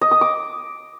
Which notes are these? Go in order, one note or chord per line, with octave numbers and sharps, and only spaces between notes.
D#5
D#6
D6